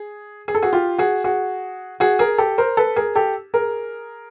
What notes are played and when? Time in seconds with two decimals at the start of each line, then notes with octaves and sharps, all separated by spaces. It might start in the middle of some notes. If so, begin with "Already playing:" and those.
Already playing: G#4
0.48 G#4
0.55 A4
0.62 F#4 G#4
0.73 F4 G4
0.98 F#4 G#4
1.24 F#4 G#4
2.00 F#4 G#4
2.19 G#4 A#4
2.38 G4 A4
2.58 A#4 C5
2.77 A4 B4
2.96 G#4 A#4
3.15 G4 A4
3.54 G#4 A#4